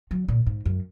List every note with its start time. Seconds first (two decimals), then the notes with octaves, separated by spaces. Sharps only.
0.11 F#3
0.28 A#2
0.46 G#2
0.66 F#2